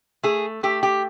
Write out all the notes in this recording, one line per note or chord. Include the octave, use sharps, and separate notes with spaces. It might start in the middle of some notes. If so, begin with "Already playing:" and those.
A3 G#4
A3 G4
G4